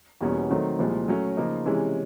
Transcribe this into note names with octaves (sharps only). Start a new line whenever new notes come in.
E2 B2 G3 A#3 C#4
D#3 F#3 A3 C4
C2 A#2 F3 G#3
F#3 A3 C#4
C#3 F3 A#3 D#4
C3 E3 G#3 C#4